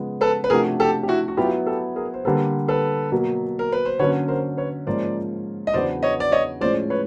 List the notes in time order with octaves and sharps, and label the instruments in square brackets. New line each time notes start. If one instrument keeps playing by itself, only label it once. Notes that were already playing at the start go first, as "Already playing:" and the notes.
Already playing: [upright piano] C#3 F3 G#3 B3
[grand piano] A4 B4
B4
[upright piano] C3 F3 A3 D4 F#4 [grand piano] G#4 A#4
[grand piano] G4 A4
G4
E4 F#4
F#4
[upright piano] F#3 B3 E4 [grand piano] F4 G4
[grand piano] G4 A4
G#4 A#4
C5
[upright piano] D3 G3 A#3 [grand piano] A4 B4
[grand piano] A4 B4
[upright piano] B2 F#3 A#3
[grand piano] A#4
B4
C5
[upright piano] D3 F#3 A#3 C#4 [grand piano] B4 C#5
[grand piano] A#4 C5
B4 C#5
[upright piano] G#2 F3 A#3 C#4 F4 [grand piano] C5 D5
[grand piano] D#5
[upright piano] E2 C#3 F#3 B3 D4 [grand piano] C5 D5
[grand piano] C#5 D#5
D5
C#5 D#5
[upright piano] A2 F3 G#3 C#4 [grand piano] C5 D5
[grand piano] B4 C#5